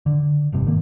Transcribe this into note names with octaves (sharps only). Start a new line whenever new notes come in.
D3
F#1 G2 C3
G#2 D#3 A#3